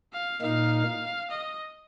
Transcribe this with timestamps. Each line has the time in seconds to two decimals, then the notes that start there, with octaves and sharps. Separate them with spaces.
0.13 F5
0.42 A#2 A#3 D#4 F5
1.31 D#5